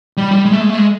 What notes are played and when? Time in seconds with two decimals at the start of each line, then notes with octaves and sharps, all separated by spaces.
0.17 G3
0.31 G3
0.45 G#3
0.53 A3
0.61 G#3
0.69 A3
0.76 G#3